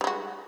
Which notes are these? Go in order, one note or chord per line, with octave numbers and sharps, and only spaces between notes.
G3 G#3 F#4